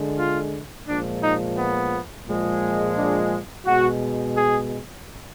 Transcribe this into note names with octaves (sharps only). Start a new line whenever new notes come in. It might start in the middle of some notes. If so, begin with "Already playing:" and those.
Already playing: D3 G#3
F4
A#2 F3 G#3 D4
D#4
B3
A#2 F3 G#3
D4
B2 G#3 F#4
G#4